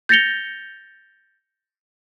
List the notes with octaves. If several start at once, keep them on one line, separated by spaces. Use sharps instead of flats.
G6 A6 A#6 C#7 F7 G7